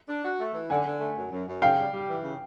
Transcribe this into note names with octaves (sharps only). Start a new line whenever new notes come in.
D4
F#4
A3
E3
D3 F#5 G#5
D3
A3
F#2
F#2
F#2
C#3 F5 G5
G3
G3
E3
C#3